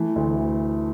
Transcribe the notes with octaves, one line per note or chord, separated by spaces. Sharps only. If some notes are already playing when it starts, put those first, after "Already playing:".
Already playing: E3 A3
D2